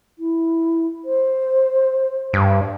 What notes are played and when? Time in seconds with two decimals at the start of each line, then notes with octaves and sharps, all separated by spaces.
0.19 E4
1.05 C5
2.33 G2